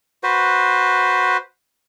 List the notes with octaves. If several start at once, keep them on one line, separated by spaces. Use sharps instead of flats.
F#4 B4 C5